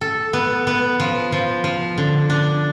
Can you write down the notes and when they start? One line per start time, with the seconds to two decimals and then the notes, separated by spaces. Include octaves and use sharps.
0.01 A4
0.33 B3
0.67 B3
1.00 F3
1.32 F3
1.64 F3
1.98 D3
2.30 D4